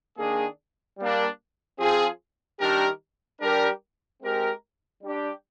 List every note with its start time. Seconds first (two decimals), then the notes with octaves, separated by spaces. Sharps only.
0.18 D#3 A#3 D4 G#4
0.98 G3 A#3 D4
1.79 F3 C4 F4 G#4
2.60 D#3 G3 D4 G4 A#4
3.40 G3 D4 G4 A#4
4.22 G#3 C4 G4 A#4
5.02 G3 D4 G4